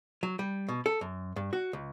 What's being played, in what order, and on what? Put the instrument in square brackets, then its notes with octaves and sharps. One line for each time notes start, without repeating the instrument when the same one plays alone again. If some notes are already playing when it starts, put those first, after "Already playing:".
[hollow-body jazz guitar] F#3
G3
B2
A4
F#2
G2
F#4
C#2